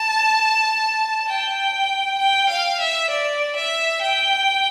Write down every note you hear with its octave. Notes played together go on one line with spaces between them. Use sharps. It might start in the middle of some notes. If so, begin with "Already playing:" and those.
Already playing: A5
G5
G5
F5
E5
D5
E5
G5